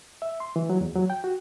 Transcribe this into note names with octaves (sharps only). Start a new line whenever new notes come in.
E5
C6
E3
F#3
E2
F#3
G5
F#4